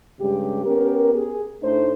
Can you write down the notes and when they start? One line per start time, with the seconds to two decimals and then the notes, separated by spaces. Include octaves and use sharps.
0.20 G2 C#3 G#3 G4
0.66 B3 C#4 G4 A#4
1.14 G#4
1.62 A2 A3 D4 D#4 C5